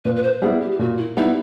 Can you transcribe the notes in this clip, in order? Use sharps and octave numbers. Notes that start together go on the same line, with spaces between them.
A#2 B4
B4
C5
G3 B3 E4 G#4
G4
G4
A#2 F#4
E4
G3 B3 D#4 E4